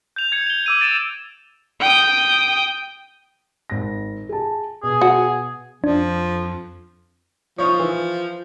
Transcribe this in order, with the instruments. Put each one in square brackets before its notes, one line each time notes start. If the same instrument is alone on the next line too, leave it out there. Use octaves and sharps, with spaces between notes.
[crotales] G6 F7
G#6 C#7 F7
F7 G7
D6 E6 D#7
A6 D7 E7
[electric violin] G5 D#6
[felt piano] G#1 A#6
G#4 A5
[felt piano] B2 [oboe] G#4
[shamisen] F#4
[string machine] F2 [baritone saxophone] F3 [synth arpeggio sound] D4
[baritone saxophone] F3 [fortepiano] C#5 C#6 D#6
[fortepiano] E3